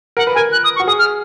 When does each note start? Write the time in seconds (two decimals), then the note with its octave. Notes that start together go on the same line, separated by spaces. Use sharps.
0.17 A#4 F#5
0.27 B4
0.35 A#4 G#5
0.52 F#6
0.64 D#6
0.76 C#6
0.80 F#4
0.87 G#4 D#6
0.99 F6